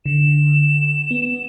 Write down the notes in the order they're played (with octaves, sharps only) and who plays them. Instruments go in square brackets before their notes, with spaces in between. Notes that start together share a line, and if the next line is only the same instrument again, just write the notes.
[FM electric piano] D3 [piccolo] E7
[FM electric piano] B3